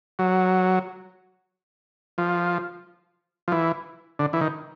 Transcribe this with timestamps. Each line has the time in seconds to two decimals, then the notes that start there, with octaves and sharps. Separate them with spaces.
0.19 F#3
2.18 F3
3.48 F3
3.52 E3
4.19 D3
4.33 E3
4.41 D#3